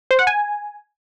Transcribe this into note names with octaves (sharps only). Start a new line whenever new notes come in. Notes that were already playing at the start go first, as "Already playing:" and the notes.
C5
F#5
G#5